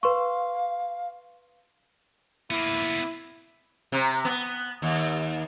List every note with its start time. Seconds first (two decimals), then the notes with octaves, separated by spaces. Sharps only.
0.03 B4 F5 C6 C#6
2.51 A#3 B3 E4
3.92 C3
4.25 B3
4.82 D#2